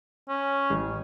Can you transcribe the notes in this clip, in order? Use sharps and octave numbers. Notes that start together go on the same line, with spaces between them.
C#4
A1